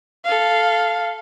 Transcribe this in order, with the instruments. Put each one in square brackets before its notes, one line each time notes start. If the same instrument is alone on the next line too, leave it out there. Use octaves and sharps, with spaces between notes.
[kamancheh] A4 F5